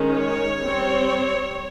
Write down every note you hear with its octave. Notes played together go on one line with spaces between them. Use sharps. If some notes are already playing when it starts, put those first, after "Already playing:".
Already playing: D#3 G#3 C#4
C#5
G3 C4